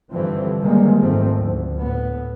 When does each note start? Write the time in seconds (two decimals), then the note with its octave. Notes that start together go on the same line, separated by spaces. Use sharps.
0.12 G2 D3 E3 F3 C4
0.60 G2 C3 D#3 G3 G#3 A#3
0.99 F#1 G#2 D#3 F3 A3 C4
1.37 D2
1.78 A2 B3